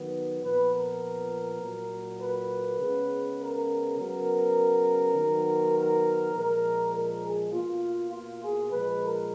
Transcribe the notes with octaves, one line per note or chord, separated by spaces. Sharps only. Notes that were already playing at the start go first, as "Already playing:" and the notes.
Already playing: D#3 F#3 B3
A#2 F3 B3 B4
A#4
A#2 F#3 A#3
B4
C#3 G#3 B3
A#4
C#3 F#3 B3 A#4
D#3 F#3 B3
A#4
A#2 F3 G#3 A#4
A#4
G#4
B2 A#3 F4
F4
G#4
A#2 F3 G#3 B4
A#4